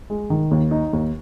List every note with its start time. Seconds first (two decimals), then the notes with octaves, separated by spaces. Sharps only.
0.10 G#3
0.30 D#3
0.51 D#2
0.71 D#4
0.93 D#2